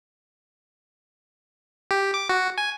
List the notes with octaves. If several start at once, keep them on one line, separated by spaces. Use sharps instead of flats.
G4
D6
F#4
G#5